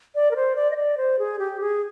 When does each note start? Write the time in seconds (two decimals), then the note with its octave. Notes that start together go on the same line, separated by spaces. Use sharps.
0.15 D5
0.31 A#4
0.36 C5
0.56 D5
0.71 D#5
0.76 D5
0.97 C5
1.19 G#4
1.39 G4
1.60 G#4